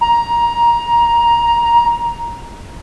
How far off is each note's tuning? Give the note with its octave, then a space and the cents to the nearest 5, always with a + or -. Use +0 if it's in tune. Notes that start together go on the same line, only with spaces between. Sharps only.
A#5 +15